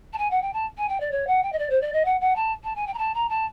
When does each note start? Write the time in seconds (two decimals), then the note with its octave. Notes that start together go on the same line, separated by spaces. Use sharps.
0.13 A5
0.18 G#5
0.30 F#5
0.42 G5
0.53 A5
0.77 G#5
0.89 G5
1.00 D5
1.11 C#5
1.27 F#5
1.43 G5
1.52 D#5
1.59 D5
1.70 C5
1.81 D5
1.93 D#5
2.05 F#5
2.20 F#5
2.36 A5
2.63 A5
2.75 G#5
2.87 G5
2.93 A#5
2.98 A5
3.14 A#5
3.29 A5